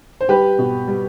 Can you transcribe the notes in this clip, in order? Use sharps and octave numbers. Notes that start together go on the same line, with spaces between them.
C5
G3 G4 B4
B2
G3